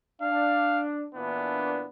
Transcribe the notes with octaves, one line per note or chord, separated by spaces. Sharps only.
D4 F5
A#2 E3 B3 D4